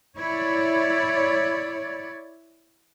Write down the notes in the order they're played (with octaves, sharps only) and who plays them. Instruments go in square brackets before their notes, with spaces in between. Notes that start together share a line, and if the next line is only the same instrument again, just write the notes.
[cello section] E4 C#5 D5